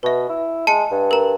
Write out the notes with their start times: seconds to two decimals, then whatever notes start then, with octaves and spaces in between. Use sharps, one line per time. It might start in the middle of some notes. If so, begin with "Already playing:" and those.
0.03 B2 B4 E5
0.29 E4
0.67 G#3 A5 C#7
0.91 G2
1.11 A#4 A#5